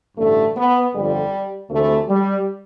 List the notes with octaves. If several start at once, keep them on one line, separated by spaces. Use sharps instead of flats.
A1 G2 D3 A3
B3
G1 F2 D3 G3
D2 C3 E3 A3
G3